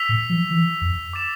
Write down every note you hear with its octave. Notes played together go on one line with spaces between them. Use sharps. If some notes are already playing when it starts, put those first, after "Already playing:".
Already playing: E6 B6 F7
A2
F3
E3
F2
D6 A6 E7